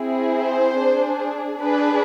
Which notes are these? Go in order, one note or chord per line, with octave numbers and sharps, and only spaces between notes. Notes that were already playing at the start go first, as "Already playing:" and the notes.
Already playing: C4 E4 G#4
C5
D4 G#4
D4 G#4 B4